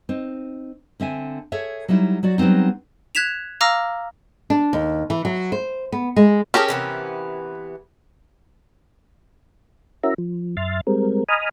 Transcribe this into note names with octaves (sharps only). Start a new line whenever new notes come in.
C4 D#4
D3 C4 E5 G#5
G#4 A4 C#5 E5
F#3 G3 D#4 E4
F#3 F#4 D5
F#3 G3 B3 C4 D#4
F#6 G#6 B6 E7 F7
F5 A#5 D6 E6 F6 A#6
D4
D#2
E3
F#3
C5
B3
G#3
C#4 G4 G#4 A#4 A5
C3 E3 B3
C#4 E4 F#4 A#4 E5 A#5
F3
F#2 E5 C6 F6 A6
G3 G#3 C4 A#4
D#5 G#5 A#5 B5 D#6 F6